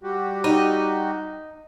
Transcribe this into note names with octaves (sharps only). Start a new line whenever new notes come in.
G3 F#4 G4
D#4